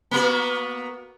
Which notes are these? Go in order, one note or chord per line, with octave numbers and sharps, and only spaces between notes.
A#3 B3 F#4